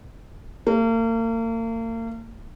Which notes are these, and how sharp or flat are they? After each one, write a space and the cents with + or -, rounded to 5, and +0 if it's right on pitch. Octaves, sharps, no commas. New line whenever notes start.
A#3 -40